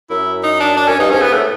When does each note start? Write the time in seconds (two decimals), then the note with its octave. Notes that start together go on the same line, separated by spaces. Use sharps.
0.10 F#2 E4
0.43 D#4
0.60 D4
0.77 F#2 D4
0.88 F#2 C#4
0.99 G2 D#4
1.10 G#2 C#4
1.19 G2 B3
1.27 G#2
1.33 A3
1.36 A2